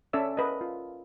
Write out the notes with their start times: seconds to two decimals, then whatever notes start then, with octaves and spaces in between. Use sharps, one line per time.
0.13 C#4 A4 D5 E5 E6
0.37 A#4 B4 D#5
0.61 F4